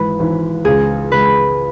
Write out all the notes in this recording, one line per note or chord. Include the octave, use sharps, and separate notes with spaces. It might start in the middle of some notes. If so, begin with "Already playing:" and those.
Already playing: G#1 G#2 E3 B4
G#1 G#2 E3
C#2 C#3 G#3 G#4
C#2 C#3 G#3 B4